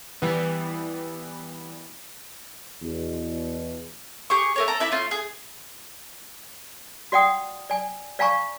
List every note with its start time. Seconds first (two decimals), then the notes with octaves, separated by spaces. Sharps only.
0.22 E3 G3 B3
2.83 E2 B2
4.30 G4 G#4 C#6
4.56 A3 A#4 C#5
4.68 A4 A#5
4.80 E4 B4 D5 E5
4.92 A3 C#4 F4
5.11 G#4
7.12 F#4 D5 F#5 G5 D#6
7.70 D5 G#5
8.19 D5 F5 G#5 A#5 C#6